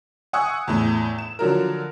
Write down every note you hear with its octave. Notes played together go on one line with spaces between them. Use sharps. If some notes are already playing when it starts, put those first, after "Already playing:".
F#5 G#5 C#6 D#6 E6 F#6
E2 A2
E7
D3 F3 F#3 A#4